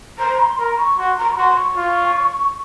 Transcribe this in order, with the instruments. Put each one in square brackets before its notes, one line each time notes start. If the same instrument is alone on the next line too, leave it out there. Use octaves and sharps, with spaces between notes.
[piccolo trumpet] C5 [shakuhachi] A#5
[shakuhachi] C6
[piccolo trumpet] A#4 [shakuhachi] A#5
[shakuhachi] C#6
[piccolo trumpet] F#4 [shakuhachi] C6
[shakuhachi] A#5
C#6
[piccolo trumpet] F#4 [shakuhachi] C6
[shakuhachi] C#6
[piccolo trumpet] F4